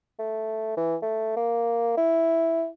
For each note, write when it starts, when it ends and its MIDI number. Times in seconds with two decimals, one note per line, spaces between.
0.19 0.72 57
0.77 0.96 52
1.02 1.35 57
1.37 1.95 58
1.97 2.67 64